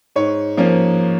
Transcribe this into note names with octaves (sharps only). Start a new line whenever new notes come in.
G#2 C#5
F3 A#3 C#4